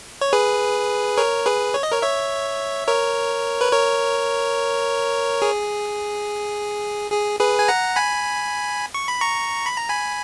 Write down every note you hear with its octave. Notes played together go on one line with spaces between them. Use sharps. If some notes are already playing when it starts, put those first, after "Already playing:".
C#5
G#4 B4
A#4 C#5
G#4 B4
C#5
D#5
A#4 C#5
C#5 E5
A#4 C#5
B4
A#4 C#5
G#4
G#4
G#4 B4
G#5
F#5 A#5
G#5 B5
C#6
B5
A#5 C#6
B5
A#5
G#5 B5